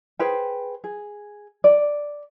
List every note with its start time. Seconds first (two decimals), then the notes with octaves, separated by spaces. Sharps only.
0.19 G#4 B4 C5 G5
0.84 G#4
1.64 D5